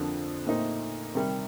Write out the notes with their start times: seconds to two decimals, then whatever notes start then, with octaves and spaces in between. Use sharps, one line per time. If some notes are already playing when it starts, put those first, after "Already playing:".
Already playing: F2 D3 F3 A#3 D4
0.46 A#2 A3 C4 D#4
1.15 C3 D#3 G3